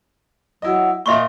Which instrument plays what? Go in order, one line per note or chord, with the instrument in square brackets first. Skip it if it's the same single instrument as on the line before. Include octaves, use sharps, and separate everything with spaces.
[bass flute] F#3 [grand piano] E4 D#5
[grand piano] A#2 D#5 G7 [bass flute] A#3 [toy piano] E5 C6 C#6